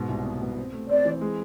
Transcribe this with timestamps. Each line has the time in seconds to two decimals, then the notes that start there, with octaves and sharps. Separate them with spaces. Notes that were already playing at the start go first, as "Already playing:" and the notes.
Already playing: G#2 B2
0.09 C2
0.25 B3
0.41 B2
0.57 C4
0.73 A3
0.89 C4 D5
1.05 E3
1.21 G#3